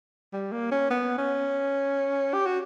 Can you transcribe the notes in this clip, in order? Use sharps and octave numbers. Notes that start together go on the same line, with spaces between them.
G3
A#3
C#4
B3
C#4
G4
F#4